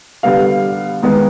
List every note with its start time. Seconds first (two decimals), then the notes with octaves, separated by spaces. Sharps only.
0.23 D3 G3 B3 F5
1.02 D#3 G#3 B3